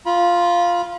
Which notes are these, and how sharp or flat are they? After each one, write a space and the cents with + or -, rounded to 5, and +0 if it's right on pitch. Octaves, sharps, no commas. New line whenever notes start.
F4 +0 B5 -35